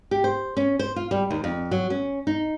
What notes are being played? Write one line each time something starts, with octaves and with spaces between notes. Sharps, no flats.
G4
C5
C#4
C5
F4
G3
D#2
F2
F#3
C#4
D#4